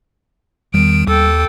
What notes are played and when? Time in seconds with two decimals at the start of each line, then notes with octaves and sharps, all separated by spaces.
0.74 E2 D#3 G3 B3 D7
1.07 D#2 A4 G5